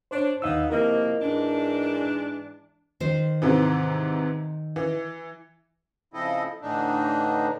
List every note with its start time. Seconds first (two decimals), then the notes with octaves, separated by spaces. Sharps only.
0.11 D4 C5 C#5
0.42 D#2 B3 D#4 F5 E6
0.70 C3 F3 A#3 E4 A#4 D#5
1.20 G#2 E3 D4
3.00 D#3 C5
3.42 G#2 C3 E3
4.76 E3
6.14 C#3 F3 C4 E4 A4 D#5
6.62 A2 D3 E3 D4 D#4